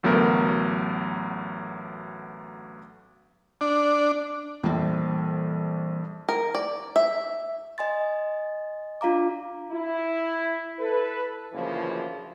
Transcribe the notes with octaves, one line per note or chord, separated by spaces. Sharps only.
A1 D2 F#3 A3 B3 A#4
D4
A#1 F2 E3 G3 A#3
A#4
D5
E5
D#5 G#5 C6 A6
D4 F4 F5 A#5 D6
E4
A4 B4
F#1 D2 C#3 E3 F3